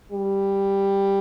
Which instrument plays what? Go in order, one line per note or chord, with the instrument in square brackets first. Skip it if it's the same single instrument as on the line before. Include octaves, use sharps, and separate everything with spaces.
[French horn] G3